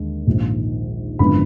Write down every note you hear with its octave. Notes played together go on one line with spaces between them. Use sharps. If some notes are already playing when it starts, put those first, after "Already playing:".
Already playing: D#2 D3 G#3
A#1 G#2 D#3
G#1 F#2 D3 F3 B3 B5